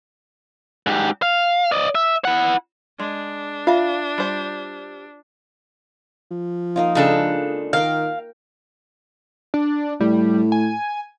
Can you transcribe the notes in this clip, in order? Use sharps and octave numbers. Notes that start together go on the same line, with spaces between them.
G#2 G4
F5
D5 D#5
E5
E4 F#5
G#3 D4
F4 E5 F5
G3 C5
F3
A#3 D#4 F4
C#3 G#3 A#3 D4 A4
D#3 A#4 F5 G5
D4
A2 G3
G#5